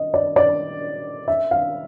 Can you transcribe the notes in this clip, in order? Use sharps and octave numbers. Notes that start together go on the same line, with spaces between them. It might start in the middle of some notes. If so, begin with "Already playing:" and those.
Already playing: D#5
D5
D5
E5
F5